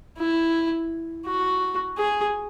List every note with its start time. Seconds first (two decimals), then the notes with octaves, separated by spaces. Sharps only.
0.18 E4
1.26 F#4
1.98 G#4